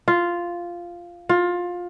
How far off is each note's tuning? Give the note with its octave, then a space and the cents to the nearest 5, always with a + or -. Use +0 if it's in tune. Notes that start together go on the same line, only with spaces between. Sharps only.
F4 -5
F4 +20